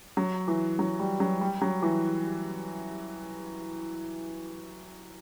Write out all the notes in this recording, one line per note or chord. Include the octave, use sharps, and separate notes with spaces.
F#3
E3
F#3
G3
F#3
G3
F#3
E3